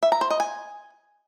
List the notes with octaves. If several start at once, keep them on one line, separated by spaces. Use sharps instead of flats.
E5
A#5
C5
D#5
G#5